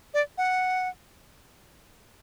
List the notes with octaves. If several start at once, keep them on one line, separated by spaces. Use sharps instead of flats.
D5
F#5